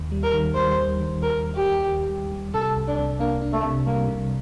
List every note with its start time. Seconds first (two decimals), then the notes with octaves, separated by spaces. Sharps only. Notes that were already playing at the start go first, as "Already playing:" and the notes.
Already playing: D#2
0.12 G3
0.23 A#4
0.34 D#3
0.55 G3 C5
0.78 D#2
1.00 D#3
1.22 D#2 A#4
1.44 D#2
1.55 G4
1.66 D#2
1.89 D#2
2.10 G3
2.32 G3
2.54 C3 A4
2.76 C2
2.88 D4
2.98 C3
3.20 A#3 D4
3.42 D4
3.53 A3
3.64 C3
3.86 G3 A#3
4.09 C3